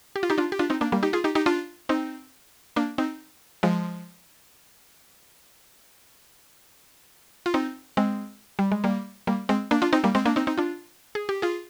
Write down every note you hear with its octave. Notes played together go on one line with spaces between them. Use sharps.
G4
F4
D#4 G4
D4 F4
G4
D4 F4
C4 D#4
A#3 D4
G3 A#3
D#4 G4
F4 G#4
D#4 G4
D#4 G4
D4 F4
C4 D#4
A#3 D4
C4 D#4
F3 G#3
F4
C4 D#4
G#3 C4
G3
G#3
G3 A#3
G3 A#3
G#3 C4
A#3 D4
D4 F4
C4 D#4
G3 A#3
G#3 C4
A#3 D4
C4 D#4
C4 D#4
D4 F4
G#4
G4
F4 G#4